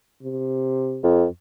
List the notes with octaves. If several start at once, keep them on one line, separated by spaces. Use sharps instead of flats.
C3
F2